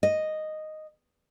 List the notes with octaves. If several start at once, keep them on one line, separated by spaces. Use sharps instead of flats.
D#5